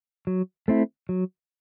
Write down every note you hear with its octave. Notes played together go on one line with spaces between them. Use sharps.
F#3
A3 C4 E4
F#3